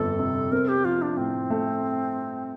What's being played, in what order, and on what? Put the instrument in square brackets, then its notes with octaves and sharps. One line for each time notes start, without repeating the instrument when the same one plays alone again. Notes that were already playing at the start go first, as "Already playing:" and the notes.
Already playing: [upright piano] G1 F2 [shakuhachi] A4
[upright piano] C3
[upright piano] C4 [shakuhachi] A#4
[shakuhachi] G4
[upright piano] F3 [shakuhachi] F4
[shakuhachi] D4
[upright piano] A2 [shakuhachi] C4
[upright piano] A3